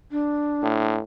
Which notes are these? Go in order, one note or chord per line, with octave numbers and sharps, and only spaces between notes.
D4
A2